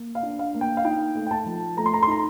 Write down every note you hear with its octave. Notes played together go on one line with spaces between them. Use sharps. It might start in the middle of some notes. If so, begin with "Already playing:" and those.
Already playing: A#3
F5
D4
F5
A#3
G5
F5
D#4 G5
A3
G5
A5
F3
A3 A#5
C6
A#5
C6
D#4 A#5